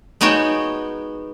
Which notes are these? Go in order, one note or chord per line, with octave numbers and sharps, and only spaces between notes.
G#3 B3 D#4 F#4 C#5 G5